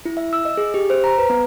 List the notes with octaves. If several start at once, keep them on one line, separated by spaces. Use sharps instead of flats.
E4
E5
E6
D#5
G#4
G4
C5
A#5
B4
B3